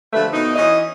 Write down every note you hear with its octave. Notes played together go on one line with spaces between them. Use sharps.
D3 F3 G3 A3 B4
B2 D#4
E3 C#4 D#5